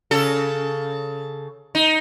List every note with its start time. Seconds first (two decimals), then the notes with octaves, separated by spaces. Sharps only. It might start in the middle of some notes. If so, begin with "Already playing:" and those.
0.11 C#3 A4
1.75 D#4